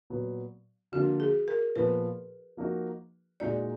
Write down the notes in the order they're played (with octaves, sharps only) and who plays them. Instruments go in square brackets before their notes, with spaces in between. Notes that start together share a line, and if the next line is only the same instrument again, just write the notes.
[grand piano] A#2 F#3 B3
[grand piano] D3 F3 A#3 D4 F4 [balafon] F#4
[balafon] G#4
A#4
[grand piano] A#2 F3 B3 [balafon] B4
[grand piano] F3 A#3 D#4 F#4
[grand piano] A#2 G#3 D#4 F#4 [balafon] D5